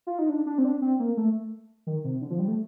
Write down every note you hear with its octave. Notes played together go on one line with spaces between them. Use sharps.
F4
D#4
D4
D4
C4
D4
C4
A#3
A3
D#3
C3
D3
F3
G3
A3